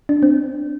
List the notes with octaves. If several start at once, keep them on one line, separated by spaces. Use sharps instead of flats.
D4
C4